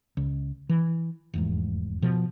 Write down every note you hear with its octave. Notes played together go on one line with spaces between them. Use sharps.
C#2
E3
F1 E2 G#2
B2 F3